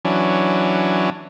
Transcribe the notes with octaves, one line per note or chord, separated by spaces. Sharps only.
E3 F#3 C#4 D4